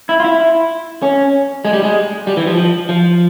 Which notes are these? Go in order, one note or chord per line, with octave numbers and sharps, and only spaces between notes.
E4
F4
E4
C#4
G#3
G3
G#3
G3
E3
F3
F3
F3